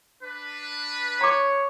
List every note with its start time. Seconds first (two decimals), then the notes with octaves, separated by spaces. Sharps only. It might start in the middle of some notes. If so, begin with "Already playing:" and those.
0.22 D4 B4
1.21 C#5 A#5 D6